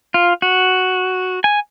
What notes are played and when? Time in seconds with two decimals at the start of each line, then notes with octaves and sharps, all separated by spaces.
0.14 F4
0.42 F#4
1.44 G#5